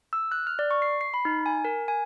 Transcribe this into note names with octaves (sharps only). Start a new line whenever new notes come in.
E6
F#6
F6
D5
C#6
C7
C7
B5
D#4
G#5
A#4
G#5